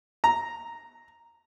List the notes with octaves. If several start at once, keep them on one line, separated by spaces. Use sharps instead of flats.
A#5